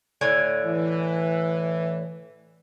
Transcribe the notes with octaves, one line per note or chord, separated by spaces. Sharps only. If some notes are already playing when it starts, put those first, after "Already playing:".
A2 D3 G#5
E3